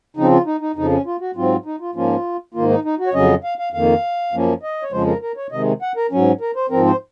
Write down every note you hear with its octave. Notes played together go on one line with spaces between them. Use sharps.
C#3 F3 C4 D#4
F4
D#4
D#4
F2 C#3 F3 D#4
C#4
F4
F#4
G#2 F#3 C4 F4
D#4
F4
G#2 F3 A#3 C#4 F4
G#2 D#3 A#3 F4
D#4
D#4
F#4
C#5
F2 C#3 F#3 C#4 D#5
F5
F5
F2 D#3 A#3 F5
F#2 F3 A#3 C#4
D#5
C#5
F2 C#3 F3 G#3 C5
A#4
A#4
C#5
C3 D#3 G#3 D#5
F#5
A#4
G#2 F#3 C#4
A#4
C5
G#2 F3 C4 A#4
C5